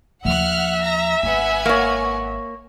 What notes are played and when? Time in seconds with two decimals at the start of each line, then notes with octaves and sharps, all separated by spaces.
0.25 D#2 F3 E5 F#5 F6 F#6
0.84 A#5 A#6
1.23 G#1 B3 F#5 G#5
1.66 A#3 C#5